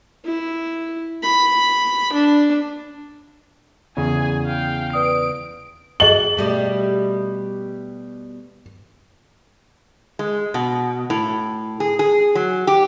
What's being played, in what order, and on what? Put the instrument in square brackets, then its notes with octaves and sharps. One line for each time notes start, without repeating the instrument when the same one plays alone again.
[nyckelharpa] E4
B5
D4
[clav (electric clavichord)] E2 C#3 [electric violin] G#4 G#5
[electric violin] F5 G5
[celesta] B4 D5 D#6 [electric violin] D7
[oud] F#4 [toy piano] G#4 D#5 C#6 [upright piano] F#7
[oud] B2 G3 A3
[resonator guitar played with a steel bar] G#3
B2
A2
G#4
G#4
F#3
G4